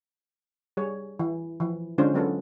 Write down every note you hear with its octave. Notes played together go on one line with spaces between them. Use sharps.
G3 G#4 C#5
E3
E3 F3
D3 G#3 C#4 D4 F4 C5
F#3 G#3 B3 C#4 F4 A4